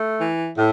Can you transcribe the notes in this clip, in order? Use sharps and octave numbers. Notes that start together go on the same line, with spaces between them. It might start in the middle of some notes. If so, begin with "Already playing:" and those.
Already playing: A3
E3
A2